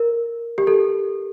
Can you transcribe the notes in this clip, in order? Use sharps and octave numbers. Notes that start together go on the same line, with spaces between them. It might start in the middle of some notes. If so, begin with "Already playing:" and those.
Already playing: A#4
G4
A4